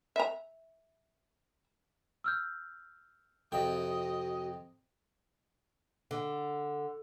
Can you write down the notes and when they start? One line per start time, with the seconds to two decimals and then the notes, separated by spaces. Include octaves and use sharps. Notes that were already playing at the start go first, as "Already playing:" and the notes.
0.16 E5 A#5
2.24 E6 F6 G6
3.52 F2 C3 F#4 D#5 G5
6.11 D3